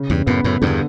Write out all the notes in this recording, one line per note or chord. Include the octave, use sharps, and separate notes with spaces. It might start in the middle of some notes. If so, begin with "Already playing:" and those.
Already playing: C#3
E2 G2
F#2 A2 B3
F#2 A2
E2 G2 D3